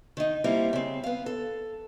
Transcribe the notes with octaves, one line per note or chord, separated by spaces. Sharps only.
D#3 D#4
G3 A#3 C4 E4 F4 G4
C#3 C4
B3 F5
A4